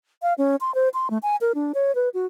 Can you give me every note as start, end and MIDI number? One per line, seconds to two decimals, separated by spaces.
0.22 0.34 77
0.38 0.56 61
0.61 0.74 84
0.75 0.89 72
0.94 1.10 84
1.10 1.18 57
1.23 1.36 80
1.41 1.52 70
1.55 1.72 62
1.74 1.94 73
1.95 2.09 71
2.14 2.26 66